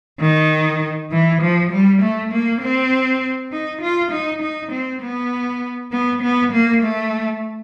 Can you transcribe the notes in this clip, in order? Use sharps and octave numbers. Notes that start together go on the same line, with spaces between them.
D#3
E3
F3
G3
A3
A#3
C4
D#4
F4
D#4
D#4
C4
B3
B3
B3
A#3
A3